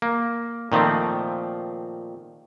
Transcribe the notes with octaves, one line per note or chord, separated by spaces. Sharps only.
A#3
A#2 D#3 F3 A3 C4